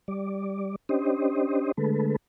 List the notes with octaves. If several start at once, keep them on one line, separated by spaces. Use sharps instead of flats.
G3 D5
C#4 D4 G4 C5 D#5
D3 G#3 A3 A4 B4